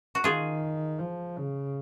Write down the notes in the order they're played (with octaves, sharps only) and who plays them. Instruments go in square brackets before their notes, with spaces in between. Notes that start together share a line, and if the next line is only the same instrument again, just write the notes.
[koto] F#4
[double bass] D#3 [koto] F4 G#4
[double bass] F3
C#3